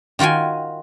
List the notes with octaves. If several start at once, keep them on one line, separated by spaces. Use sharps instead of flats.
D#3 F4 F#4 G5 G#5